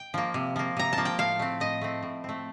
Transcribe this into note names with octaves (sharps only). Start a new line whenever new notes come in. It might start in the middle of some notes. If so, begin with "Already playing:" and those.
Already playing: G5
F3 A#3
C3
F3 A#3
C3 A#5
A5
F3 A#3
G5
A2 F5
A3 C4
A2 D#5
A3 C4
A2
A3 C4